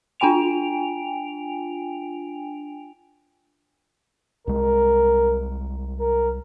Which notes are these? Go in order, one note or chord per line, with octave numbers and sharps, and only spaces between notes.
D4 F4 G5 G#5 D7 F7
C2 G#3 A#4
A#4